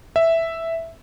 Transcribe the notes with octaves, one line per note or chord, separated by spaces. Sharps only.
E5